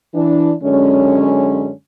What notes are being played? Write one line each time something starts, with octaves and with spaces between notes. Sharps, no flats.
E3 D4
F#2 D3 G#3 C#4